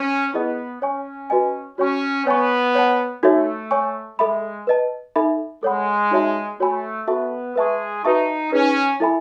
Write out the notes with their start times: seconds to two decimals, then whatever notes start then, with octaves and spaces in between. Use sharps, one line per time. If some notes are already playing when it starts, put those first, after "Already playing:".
Already playing: C#4
0.34 B3 E4 G#4 D#5
0.82 C#4 C#5 G#5 C#6
1.30 F#4 B4 D#5 G#5
1.78 C#4 F#4 C#5 G#5 C#6
2.26 B3 C#5 G#5 C#6
2.75 C#5 F#5 A5
3.22 A3 D#4 F#4 A4 C#5 E5
3.71 C#5 G#5 C#6
4.19 G#3 A4 E5 B5
4.67 B4 D#5 A5
5.16 D#4 A4 E5 B5
5.63 G#3 A4 C#5 F#5 B5
6.11 D#4 F#4 C#5 E5 A5
6.59 A3 F#4 C#5 G#5 B5
7.07 B3 F#4 A4 E5 A5 C#6
7.55 G#3 G#4 B4 E5 A5 C#6
8.04 D#4 F#4 B4 E5 A5 C#6
8.52 C#4 D#4 G#4 B4
9.00 E4 A4 E5 G#5 B5